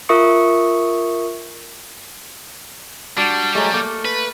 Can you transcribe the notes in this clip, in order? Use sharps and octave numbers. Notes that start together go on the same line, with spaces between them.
F4 A#4 E5 C#6 D#6 C#7
G3 D4 F#4
F#3 G#3 A3
A3 A#3
B4